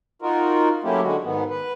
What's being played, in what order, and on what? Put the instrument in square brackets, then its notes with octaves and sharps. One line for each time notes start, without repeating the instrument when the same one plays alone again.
[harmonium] D#4 F4 F#4 A#4
F#3 A3 A#3 C#4 E4 G4
D3 G#3 F#4
G#2 D#3 B3
B4